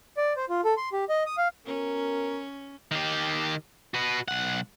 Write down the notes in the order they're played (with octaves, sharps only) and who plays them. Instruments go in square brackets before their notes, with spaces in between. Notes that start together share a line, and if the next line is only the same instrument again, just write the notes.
[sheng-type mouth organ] D5
C5
F4
A4
C6
G4
D#5
D#6
F5
[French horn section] B3 F#4 A#4 [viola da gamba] C#4
[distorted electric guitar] D#3 G4
F#4 B4
B1 F#5